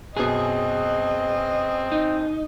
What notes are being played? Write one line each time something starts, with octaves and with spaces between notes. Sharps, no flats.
F#2 B2 C4 G#4 D#5
D#4